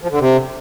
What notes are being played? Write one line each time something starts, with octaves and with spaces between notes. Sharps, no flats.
F3
D3
C3